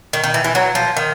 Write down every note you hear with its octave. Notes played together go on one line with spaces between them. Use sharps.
D#3
D#3
E3
E3
F#3
F3
D#3